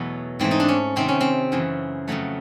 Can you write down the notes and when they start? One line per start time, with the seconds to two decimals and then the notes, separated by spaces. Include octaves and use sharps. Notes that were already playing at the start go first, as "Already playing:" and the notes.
Already playing: E2 B2 F#3 A3 B3
0.40 G#2 E3 A3 C4
0.51 D#4
0.60 D4
0.68 C#4
0.96 C3 D#3 F#3 A3 C4
1.09 C#4
1.21 C4
1.52 F#2 C#3 E3
2.08 F2 C#3 F#3 A3